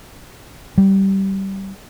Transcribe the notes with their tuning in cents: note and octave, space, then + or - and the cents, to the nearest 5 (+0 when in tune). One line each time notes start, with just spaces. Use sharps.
G3 -20